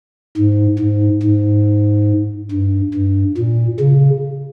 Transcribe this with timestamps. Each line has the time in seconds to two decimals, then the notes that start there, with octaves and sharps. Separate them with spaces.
0.37 G#2
0.79 G#2
1.23 G#2
2.52 G2
2.94 G2
3.37 A#2
3.80 C#3